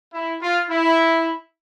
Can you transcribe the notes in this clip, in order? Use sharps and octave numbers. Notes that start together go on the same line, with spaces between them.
E4
F4
E4